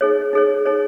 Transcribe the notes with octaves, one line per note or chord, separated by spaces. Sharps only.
D#4 G#4 C#5
D#4 G#4 C#5
D#4 G#4 C#5